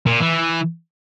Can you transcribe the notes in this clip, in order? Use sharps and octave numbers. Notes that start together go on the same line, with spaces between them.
A#2
E3